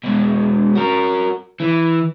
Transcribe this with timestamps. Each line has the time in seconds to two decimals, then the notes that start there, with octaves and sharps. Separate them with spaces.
0.04 B2 G#3
0.75 F#4 A#4
1.60 E3